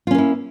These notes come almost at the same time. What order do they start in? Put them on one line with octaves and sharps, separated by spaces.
F4 C#4 A#3 E4